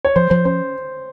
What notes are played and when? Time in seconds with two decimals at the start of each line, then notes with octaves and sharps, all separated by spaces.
0.05 C#5
0.16 F3 C5
0.30 F3 C5
0.45 C#4 C5